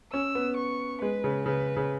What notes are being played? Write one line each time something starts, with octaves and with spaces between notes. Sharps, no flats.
C#4 E6
B3
C#6
G#3 B4
C#3
C#3 B4
C#3